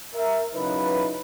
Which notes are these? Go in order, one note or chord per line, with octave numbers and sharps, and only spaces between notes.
A#4 E5
C#3 F#3 D#4 E4 B4